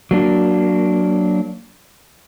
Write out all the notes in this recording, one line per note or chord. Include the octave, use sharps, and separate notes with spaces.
F#3 A#3 D4